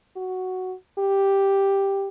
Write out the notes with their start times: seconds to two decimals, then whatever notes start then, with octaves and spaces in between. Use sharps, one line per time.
0.16 F#4
0.99 G4